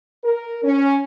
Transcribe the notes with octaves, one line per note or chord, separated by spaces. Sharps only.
A#4
C#4